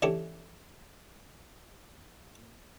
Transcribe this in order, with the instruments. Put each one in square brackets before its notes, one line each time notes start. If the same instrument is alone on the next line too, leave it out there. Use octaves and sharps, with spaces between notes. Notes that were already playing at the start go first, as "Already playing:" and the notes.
[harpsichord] E3 C#4 D4 G4 A4